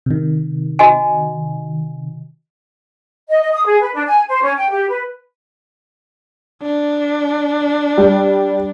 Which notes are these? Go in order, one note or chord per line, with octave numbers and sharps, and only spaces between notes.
C3 D#3
F#4 D#5 G#5
D#5
D#5
D#6
G#4
B4
D4
G#5
C5
C#4
G5
G4
B4
D4
G3